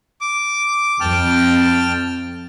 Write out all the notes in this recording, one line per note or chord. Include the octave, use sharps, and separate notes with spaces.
D6
F2 G5 A5 F6